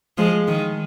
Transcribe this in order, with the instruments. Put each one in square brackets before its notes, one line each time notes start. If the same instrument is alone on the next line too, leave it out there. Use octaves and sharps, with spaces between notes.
[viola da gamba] F3 G#3
D#3